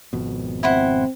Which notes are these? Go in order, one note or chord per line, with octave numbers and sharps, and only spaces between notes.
G#1 F2 B2
C4 E4 C5 F#5